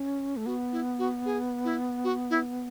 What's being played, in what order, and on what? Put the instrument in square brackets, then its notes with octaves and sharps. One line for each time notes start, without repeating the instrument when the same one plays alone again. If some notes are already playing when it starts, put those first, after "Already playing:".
Already playing: [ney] C#4
A3
[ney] B3 [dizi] F#4
[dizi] E4
F#4
G#4
E4
F#4
E4